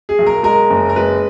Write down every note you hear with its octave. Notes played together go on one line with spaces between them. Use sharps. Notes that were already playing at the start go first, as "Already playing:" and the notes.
G#4
B1
A#4
G#3 A#4
F#1
A#4
G#3 B4